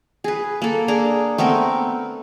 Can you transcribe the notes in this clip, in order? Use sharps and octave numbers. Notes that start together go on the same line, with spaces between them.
G#4 B4
A#3 A4
D4 G#4 A#4
A3 B3 C4 A#4